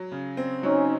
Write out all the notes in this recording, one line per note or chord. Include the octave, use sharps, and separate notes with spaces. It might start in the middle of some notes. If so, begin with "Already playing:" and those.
Already playing: F#3
C#3
C4
F#3 C#4 D#4